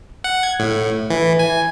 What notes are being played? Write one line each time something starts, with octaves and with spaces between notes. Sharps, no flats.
F#5
G#6
A2
E3
G#5